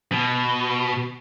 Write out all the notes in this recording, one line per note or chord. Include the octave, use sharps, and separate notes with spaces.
B2